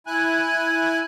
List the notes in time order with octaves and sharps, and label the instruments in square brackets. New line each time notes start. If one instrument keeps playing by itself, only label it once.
[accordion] E4 G#5 F#6